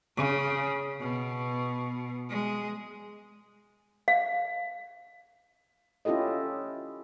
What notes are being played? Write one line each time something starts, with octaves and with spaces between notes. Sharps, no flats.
C#3
B2
G#3
F5
C#4 E4 F4 G4 A4 D#5